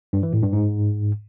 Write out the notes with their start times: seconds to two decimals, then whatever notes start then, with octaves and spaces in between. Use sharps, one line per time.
0.13 G2
0.23 E3
0.33 A2
0.43 G2
0.53 G#2